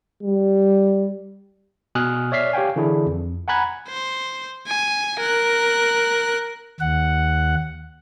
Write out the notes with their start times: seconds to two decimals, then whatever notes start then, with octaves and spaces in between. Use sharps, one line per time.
0.23 G3
1.95 B2 G#5 D#6 F6 F#6
2.32 C#5 D5 E5 F6 B6 C7
2.53 G4 C#5 F5 G5 G#5
2.76 D3 E3 D4 E4 G#4
3.06 F2
3.48 F#5 G#5 A#5 B5 F#6 G#6
3.88 C5
4.67 G#5
5.20 A#4 F#6
6.80 D#2 F#5